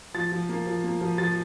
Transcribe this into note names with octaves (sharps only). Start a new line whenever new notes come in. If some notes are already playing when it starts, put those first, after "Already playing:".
F3 A6
F3
A#3
F3
A#3
F3
F3 A6